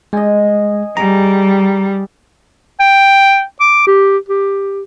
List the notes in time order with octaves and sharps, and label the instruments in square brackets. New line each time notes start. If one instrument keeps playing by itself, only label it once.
[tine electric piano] G#3 [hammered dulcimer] D#5 G#5
[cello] G3 [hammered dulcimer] G#4 [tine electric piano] A#5
[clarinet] G5
D6
G4
G4